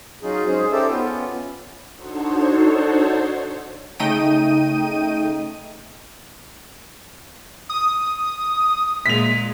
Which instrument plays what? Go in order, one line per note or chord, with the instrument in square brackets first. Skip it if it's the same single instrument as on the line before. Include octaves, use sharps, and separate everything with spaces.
[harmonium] F#3 C#4 D#4 F4 G#4
G#3 C#4 G#4 C5
D#4 G4 A4 C5 D5 E5
B3 C#4 F4
[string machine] D4 D#4 F#4 A4 C5 C#5
[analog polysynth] C#3 A3 D#4 D#5 G5 D#7
[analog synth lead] D#6
[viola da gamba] A#2 G#3 [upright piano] B6 F7